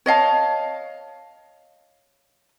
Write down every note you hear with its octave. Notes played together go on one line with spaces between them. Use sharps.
C#5 D#5 F5 A5